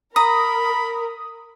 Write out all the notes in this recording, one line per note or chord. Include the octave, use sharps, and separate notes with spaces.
A#4 A#5 B5 D#6